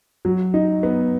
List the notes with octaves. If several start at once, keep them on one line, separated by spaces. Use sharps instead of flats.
F#3
D#4
B3